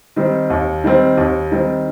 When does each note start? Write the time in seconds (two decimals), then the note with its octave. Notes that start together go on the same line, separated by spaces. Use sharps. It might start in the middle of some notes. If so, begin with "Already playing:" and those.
0.16 D#3 G3 C4
0.50 D#2
0.84 D#3 G3 C4
1.17 D#2
1.51 D#3 G3 C4